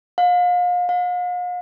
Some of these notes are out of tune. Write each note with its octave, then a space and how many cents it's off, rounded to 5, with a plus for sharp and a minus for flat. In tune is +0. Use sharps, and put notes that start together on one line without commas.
F5 +35
F5 +45